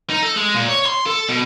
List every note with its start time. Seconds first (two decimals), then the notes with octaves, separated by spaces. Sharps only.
0.10 D#4
0.23 A4
0.36 G#3
0.55 A#2
0.68 C#5
0.86 C6
1.06 A4
1.29 B2